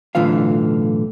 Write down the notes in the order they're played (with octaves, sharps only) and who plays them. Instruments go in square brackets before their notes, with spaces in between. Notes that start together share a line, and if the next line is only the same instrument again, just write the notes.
[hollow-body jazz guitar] B1 A2 D3 E3 F4 F5